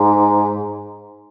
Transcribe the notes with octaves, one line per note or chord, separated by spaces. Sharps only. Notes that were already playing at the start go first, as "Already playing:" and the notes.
Already playing: G#2